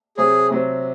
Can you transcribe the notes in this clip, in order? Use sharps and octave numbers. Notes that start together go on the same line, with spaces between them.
C3 F#3 C4 G#4
C3 F#3 C4